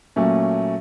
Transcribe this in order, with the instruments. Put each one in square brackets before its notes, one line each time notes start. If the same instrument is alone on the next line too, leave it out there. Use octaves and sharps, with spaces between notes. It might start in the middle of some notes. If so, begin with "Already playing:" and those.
[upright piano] A#2 F#3 A3 C#4